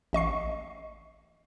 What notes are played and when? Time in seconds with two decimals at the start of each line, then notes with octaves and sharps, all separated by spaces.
0.13 A1 D#5 C#6 C7